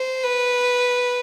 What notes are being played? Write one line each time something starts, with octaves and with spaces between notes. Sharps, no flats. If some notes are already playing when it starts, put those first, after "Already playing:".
Already playing: C5
B4